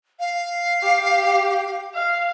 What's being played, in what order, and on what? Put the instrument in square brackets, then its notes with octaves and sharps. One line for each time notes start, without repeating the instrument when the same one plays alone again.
[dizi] F5
[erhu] G4
F5